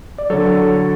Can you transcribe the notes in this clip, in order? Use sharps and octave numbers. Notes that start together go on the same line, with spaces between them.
D5
D3 F#3 A4 C#5